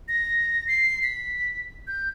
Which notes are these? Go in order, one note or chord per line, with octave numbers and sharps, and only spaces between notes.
A#6
C7
B6
G6